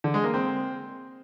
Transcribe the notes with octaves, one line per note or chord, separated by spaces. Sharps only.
D3
G#3
A#3
C4